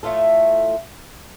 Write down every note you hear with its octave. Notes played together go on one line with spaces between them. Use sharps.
A2 A3 F4 A4